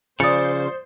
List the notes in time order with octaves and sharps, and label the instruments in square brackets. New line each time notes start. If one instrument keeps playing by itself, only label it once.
[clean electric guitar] C#3 [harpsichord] F3 D5 [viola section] C5 [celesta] D#6 A6 C#7